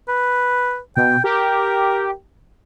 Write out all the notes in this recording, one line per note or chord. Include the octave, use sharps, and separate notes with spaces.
B4
B2 G5
G4 A#4